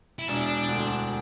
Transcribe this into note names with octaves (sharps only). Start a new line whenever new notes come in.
E4
E1 D4
D2